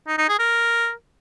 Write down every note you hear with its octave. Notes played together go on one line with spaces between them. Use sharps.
D#4
D#4
G#4
A#4